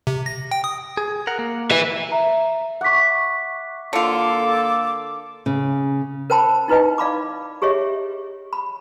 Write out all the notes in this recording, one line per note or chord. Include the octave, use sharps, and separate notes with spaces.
C3
A#6
G5
D#6
G#4
A#4 F#5
A#3
B4 E5
E5 A#5
E5 F#5 C#6 D6 B6
D3 A#3 F4 A4 D6
C#3
A#4 C5 G5 A5 B5
D#4 E4 B4 D#5 G5
D5 F5 B5 D6
G4 G#4 C#5 D#5 E5
B5